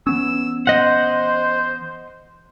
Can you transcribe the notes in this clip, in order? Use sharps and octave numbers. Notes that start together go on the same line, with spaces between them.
E3 B3 C#4 E6
C5 D#5 F#5